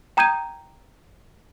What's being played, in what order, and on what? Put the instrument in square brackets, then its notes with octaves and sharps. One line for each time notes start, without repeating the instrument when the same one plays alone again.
[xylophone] G5 A#5 D#6 G6 G#6 D#7